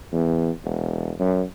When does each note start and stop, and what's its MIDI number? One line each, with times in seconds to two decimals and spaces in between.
0.13 0.50 40
0.65 1.12 28
1.20 1.43 42